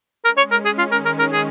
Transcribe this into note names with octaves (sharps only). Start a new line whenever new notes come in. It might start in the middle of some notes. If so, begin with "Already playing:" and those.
G#3 C#4 A#4
C#5
A#4
G#4
D#3 G#3 F4
A#4
A#4
A#4
G#4